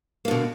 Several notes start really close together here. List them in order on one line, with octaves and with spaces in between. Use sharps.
A#3 D3 B2